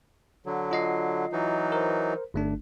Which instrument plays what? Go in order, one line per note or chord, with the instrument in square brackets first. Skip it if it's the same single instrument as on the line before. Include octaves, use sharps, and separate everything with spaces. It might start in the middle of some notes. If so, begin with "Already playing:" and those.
[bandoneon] D3 F#3
[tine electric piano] F4 D#5 C7
[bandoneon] E3 F#3 D#4
[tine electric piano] A#4 C5
G1 A3 D4